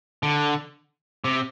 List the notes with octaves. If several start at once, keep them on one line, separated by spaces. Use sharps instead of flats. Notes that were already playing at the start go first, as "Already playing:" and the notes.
D3
C3